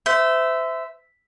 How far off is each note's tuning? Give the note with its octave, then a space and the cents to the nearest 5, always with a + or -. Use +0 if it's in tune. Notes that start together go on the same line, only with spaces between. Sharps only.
C5 -35 E5 +0